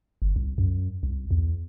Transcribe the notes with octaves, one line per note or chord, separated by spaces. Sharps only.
G1
C2
F#2
C2
E2